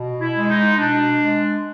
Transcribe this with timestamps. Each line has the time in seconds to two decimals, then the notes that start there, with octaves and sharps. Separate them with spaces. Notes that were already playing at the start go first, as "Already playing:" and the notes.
Already playing: B2
0.21 E4
0.35 G#3
0.50 D#4
0.78 B2 D4
1.21 G#3